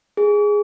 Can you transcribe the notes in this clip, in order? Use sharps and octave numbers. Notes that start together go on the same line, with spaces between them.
G#4